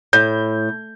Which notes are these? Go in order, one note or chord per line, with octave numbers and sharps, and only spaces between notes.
A2 G6